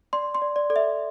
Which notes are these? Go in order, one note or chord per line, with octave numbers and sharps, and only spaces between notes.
D5 C6
C6
D5
D5
A4 D5
E5